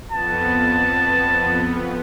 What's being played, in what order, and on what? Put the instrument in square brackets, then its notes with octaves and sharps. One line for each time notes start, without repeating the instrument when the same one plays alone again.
[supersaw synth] F2 B3 [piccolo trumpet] A5